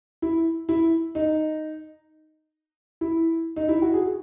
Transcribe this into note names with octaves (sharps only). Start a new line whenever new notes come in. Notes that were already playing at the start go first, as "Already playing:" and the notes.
E4
E4
D#4
E4
D#4
E4
F#4
G#4